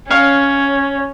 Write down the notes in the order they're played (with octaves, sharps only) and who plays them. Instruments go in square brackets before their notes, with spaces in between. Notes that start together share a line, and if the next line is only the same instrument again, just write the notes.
[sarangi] C#4 [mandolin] C#5 F5